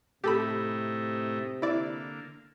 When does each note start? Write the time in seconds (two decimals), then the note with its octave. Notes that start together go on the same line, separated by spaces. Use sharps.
0.24 A2 C3 A3 D#4 G4 A4 B5
1.62 D3 A#3 E4 D5